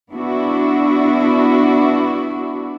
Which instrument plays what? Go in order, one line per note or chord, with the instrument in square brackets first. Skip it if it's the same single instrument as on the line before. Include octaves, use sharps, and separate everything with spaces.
[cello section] B3 D4 E4 F#4